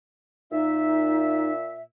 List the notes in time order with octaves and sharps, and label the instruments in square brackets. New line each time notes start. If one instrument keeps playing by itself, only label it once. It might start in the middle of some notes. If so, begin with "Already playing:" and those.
[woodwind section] A#2 E5 [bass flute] D#4